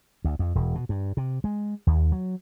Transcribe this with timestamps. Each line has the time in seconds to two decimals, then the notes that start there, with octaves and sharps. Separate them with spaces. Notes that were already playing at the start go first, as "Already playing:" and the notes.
0.24 D2
0.39 F2
0.55 E1
0.75 B2
0.89 G2
1.17 C3
1.44 G#3
1.87 D#2
2.12 F#3